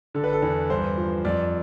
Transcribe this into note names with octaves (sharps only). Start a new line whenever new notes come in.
D3 A4
B4
A4
E2
G2 C5
F3
F2 D5